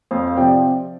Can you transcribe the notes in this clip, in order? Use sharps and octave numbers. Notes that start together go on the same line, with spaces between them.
F2 C5 F5
F5
C3 F3 C4 D5 G5